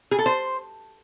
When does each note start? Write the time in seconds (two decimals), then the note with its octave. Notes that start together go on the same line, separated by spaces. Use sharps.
0.11 G#4
0.19 A4
0.26 C5